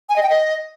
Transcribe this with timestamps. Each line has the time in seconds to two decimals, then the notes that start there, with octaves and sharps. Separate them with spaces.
0.09 G#5
0.16 D#5
0.23 G5
0.30 D#5